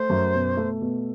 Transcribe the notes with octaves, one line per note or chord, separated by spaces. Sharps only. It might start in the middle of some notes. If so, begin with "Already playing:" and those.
Already playing: A3 C5
F#2
B2
A3
B2